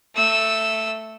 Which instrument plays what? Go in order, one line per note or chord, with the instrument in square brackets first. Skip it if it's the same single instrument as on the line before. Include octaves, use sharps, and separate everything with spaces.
[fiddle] A3 E6